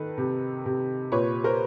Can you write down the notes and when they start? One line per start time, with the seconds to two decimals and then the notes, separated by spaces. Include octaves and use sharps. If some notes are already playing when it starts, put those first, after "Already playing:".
Already playing: D#3 A4 B4
0.18 C3
0.66 C3
1.12 A#2 B4 C#5
1.44 A#4 C5